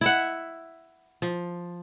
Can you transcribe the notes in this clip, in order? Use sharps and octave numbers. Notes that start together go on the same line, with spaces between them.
E4 E5 F#5
F3